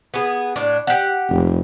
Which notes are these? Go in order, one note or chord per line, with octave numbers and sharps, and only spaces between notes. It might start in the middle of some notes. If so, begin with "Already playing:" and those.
B3 G#4
A2 D4
G4 F#5
F1